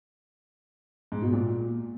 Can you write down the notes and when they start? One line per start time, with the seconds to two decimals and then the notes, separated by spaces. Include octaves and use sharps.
1.12 G#2
1.22 B2
1.32 A#2